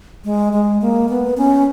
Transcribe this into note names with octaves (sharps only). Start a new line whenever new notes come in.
G#3
G#3
A#3
B3
C#4